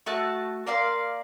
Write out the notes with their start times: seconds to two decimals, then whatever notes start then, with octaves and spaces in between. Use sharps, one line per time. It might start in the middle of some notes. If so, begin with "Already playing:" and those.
0.06 A3 F#4 A5 F#6
0.67 A#3 D5 F5 C6